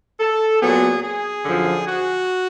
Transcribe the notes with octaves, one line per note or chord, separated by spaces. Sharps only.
A4
A#2 F#3 B3 G#4
G#4
F#2 D3 F3
F#4